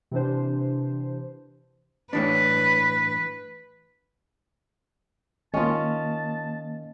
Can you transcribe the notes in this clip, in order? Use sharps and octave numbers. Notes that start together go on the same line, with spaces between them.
C3 E3 D4 C5
A2 E3 D4 B4
D#3 A#3 C#4 F4 D#5 A5